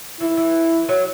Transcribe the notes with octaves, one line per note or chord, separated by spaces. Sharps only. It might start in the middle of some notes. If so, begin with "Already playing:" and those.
E3 E4
E3
F#3